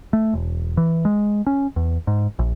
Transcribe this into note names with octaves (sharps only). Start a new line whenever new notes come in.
A3
E1
E3
G#3
C#4
E2
G#2
A#1